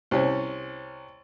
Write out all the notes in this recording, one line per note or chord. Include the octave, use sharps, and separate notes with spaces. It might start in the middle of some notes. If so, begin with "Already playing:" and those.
C2 C#4